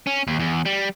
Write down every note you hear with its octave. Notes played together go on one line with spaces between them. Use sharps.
C#4
D#2
E2
G3